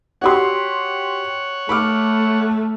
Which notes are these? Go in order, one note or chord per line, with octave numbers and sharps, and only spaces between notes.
F#4 G4 C#5 F#5 C6
A3 B5 D6 F6